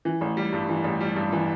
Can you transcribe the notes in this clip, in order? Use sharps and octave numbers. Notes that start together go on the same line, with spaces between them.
E3
A1
G3
G2
E3
A1
G3
G2
E3